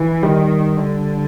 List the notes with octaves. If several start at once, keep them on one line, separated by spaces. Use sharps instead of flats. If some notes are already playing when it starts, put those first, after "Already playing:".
Already playing: E3
D#3 G3
D3